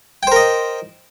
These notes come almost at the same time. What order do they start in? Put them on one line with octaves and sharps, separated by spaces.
G5 C5 A#4 D#5